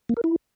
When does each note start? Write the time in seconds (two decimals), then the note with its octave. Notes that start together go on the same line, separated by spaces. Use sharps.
0.09 A#3
0.17 A#4
0.24 E4